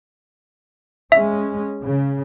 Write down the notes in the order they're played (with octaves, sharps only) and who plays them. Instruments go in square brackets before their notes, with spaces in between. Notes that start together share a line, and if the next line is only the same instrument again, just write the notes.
[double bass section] G#3 C#4 [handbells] E5
[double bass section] C#3